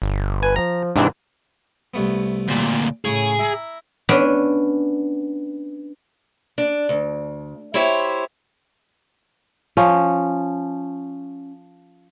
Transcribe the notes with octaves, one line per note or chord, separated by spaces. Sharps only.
G1
B4 G#5
F3 A#5
G#2 C3 E3 D4
C2 A3 B3
D2 A#2
A2 C#3 G#4 C#5
E4 A#5
B3 C#4 D4
D4
D2
E4 G4 C5 C#5 E5
F3 C#4